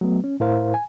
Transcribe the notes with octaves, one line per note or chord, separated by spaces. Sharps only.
F#3 A3 B3
C#4
A2 E4 A#4 C5 F5
G#5